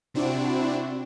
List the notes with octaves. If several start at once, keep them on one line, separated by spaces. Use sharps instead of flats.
C3 C4 D4 E4 F#4